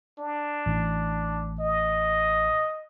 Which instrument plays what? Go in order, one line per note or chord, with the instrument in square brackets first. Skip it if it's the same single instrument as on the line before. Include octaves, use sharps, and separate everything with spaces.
[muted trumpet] D4
[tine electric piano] A1
[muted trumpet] D#5